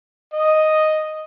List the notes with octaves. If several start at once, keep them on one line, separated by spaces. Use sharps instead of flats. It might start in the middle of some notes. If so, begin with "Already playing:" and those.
D#5